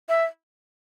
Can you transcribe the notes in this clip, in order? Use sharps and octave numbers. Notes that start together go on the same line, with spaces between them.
E5